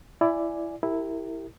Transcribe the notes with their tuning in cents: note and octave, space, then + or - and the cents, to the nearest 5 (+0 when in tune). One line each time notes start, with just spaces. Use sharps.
E4 +15 D5 +0 G#5 +0
E4 -5 G4 +0 A#4 -30